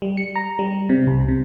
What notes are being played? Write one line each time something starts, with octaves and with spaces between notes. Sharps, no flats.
G3
C#7
A#5
G3
C3
C2
C3